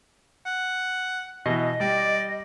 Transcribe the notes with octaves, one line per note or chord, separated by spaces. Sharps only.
F#5
B2 E3 D#5
G3 D5